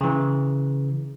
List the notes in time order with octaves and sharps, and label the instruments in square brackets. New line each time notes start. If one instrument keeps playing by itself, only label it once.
[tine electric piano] C#3 E3